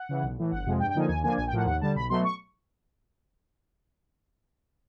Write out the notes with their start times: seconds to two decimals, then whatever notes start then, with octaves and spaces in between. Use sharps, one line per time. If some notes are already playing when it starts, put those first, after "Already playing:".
Already playing: F#5
0.09 C#3 E3
0.23 B1
0.38 A2 E3
0.51 G1 F#5
0.66 F2 C3 F3 G#3
0.80 G2 G5
0.90 G5
0.95 D3 F3 A#3 D#4 G#5
1.09 D#2 G#5
1.23 D3 F3 A#3 D4 G#5
1.37 A#1 G#5
1.47 G5
1.52 A2 F3 A#3 F#5
1.66 D#2 F#5
1.81 D3 G3 A5
1.95 B1 B5
2.09 B2 F#3 A3 C6
2.24 C#6